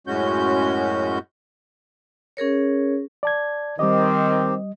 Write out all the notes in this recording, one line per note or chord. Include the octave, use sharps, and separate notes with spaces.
F#2 A2 G#3 C#4 F#4 G6
C#4 G#4 A#4 C#5
D5 A5 G#6
D#3 G3 C4 G4 D#5